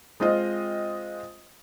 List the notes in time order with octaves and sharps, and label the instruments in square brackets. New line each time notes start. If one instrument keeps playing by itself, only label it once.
[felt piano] G#3 C4 F4 D#5